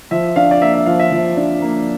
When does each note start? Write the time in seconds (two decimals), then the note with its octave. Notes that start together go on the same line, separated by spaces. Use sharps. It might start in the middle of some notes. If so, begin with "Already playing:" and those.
0.11 F3 E5
0.36 D4 F5
0.51 D5
0.61 A#3 E5
0.73 E5
0.86 F3 F5
0.99 E5
1.12 F3
1.37 D4
1.62 A#3